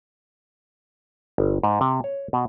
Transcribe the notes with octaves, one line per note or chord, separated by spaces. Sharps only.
G1
G#2
C3
C#5
B2